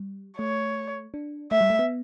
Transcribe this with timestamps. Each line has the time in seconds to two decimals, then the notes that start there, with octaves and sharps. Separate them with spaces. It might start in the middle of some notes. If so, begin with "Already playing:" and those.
Already playing: G3
0.39 A3 C#5
1.14 D4
1.51 A3 E5
1.61 G3
1.70 A3
1.79 B3